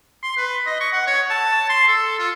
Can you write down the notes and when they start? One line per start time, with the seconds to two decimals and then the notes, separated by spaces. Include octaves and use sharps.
0.23 C6
0.37 B4
0.66 D#5
0.81 C#6
0.93 F#5
1.07 C#5
1.30 A5
1.70 C6
1.88 A4
2.19 F4